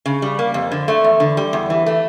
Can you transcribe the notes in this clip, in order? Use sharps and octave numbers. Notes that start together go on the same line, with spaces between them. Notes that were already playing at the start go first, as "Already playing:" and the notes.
C#3
G3
A#3
F2
D3
A3
E2
D3
G3
E2
E3
A3